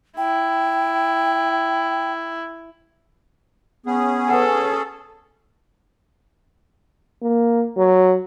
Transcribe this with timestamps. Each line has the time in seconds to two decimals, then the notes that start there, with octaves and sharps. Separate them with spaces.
0.17 E4 G5
3.86 B3 C#4 G#4
4.30 A4 B4 F#5
7.22 A#3
7.77 F#3